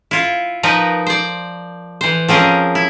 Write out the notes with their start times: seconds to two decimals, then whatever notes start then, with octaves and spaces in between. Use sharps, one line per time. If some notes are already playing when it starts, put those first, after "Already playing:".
0.11 E4 F4
0.63 F3 D#4 A#4 B4
1.06 C5 D5
2.01 E3 C5
2.28 F3 C4 C#4 G#4 A#4
2.75 E4